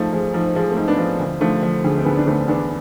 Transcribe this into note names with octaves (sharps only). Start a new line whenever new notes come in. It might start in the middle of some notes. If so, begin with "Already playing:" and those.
Already playing: G#2 F3 A3
F3 G#3
G#3
G#2 F3
F3 G#3
A3 C4
G#2
B3 D4
F3
D2
D3 F3 A3
F3
D2 G#3
C4
D2 G#3 B3
D4
D3 A3 C4
E2 B3 D4